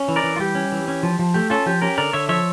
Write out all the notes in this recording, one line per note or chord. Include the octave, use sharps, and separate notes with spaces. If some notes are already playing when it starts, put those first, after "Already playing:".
Already playing: C#4
E3
A#4 D5
E3
F4
G3 G4
C#4
E3
C#4
F3
F3
A3 G4
C#4 F4 A4
F3 G4
C#4 G4 A#4
D3 A#4 D5
D3 C#5 E5
F3 C#5 E5